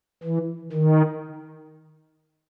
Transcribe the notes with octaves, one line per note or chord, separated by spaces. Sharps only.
E3
D#3